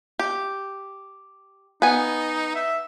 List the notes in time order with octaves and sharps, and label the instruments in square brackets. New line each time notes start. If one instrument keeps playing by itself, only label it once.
[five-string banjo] G4
[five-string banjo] B3 G#5 [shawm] D#4
[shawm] E5